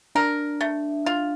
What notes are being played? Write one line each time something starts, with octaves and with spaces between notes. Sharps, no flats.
D4 A#4
A3
F4